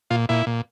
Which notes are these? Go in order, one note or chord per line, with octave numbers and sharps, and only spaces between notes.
A#2 F4
A#2 E4
A#2